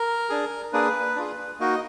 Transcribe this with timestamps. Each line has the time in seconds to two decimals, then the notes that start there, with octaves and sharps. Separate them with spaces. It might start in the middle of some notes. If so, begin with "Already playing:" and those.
Already playing: A#4
0.30 D4 G#4
0.73 A#3 D4 G#4 B4
1.16 D4 F4 G#4
1.60 A#3 D#4 F#4 D#5